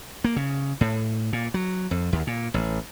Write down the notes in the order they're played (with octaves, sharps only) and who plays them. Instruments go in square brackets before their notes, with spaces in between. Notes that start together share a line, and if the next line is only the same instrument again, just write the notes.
[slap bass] A#3
C#3
A2
A#2
F#3
F2
D#2
A#2
A1